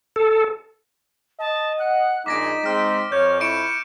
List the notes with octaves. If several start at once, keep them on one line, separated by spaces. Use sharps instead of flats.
A4
D#5 A5
F#5 F#6
A#1 G#3 D#4 D6 A#6 B6 D7
G#3 C4 F6 A#6
F2 C#5 F6 G6
E4 C#6 C#7 D7 E7